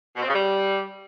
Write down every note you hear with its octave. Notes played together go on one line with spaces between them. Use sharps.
B2
C4
C#3
G3